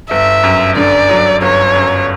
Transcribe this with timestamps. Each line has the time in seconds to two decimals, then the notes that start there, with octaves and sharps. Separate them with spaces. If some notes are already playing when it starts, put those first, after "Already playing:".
0.11 G1 E5
0.43 F#2
0.76 D3 D5
1.10 F#3
1.42 G1 C#5
1.76 F#2